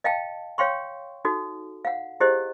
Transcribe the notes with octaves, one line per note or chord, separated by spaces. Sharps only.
D#5 F5 G5 A5
C#5 F5 G5 C6 C#6
D#4 F#4 A4
F5 F#5
E4 G4 G#4 C5 D#5